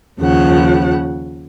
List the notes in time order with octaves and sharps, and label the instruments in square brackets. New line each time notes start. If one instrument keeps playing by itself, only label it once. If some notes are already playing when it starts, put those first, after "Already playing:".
[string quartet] D#2 C#3 F3 F#5